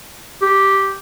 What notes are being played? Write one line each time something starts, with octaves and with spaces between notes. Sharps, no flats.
G4